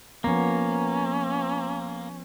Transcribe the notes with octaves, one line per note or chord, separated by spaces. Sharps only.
F3 A#3 B3 C#4